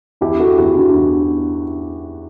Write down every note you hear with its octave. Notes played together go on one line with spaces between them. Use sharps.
E2 E4 G4
F#4 A4
E2 E4 G4
D4 F#4
E2